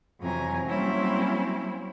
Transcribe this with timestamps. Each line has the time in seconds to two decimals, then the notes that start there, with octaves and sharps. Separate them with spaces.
0.21 F2 C3 E3 F#3 G#5 A#5
0.64 F#3 G3 A#3 C4 C#4 E4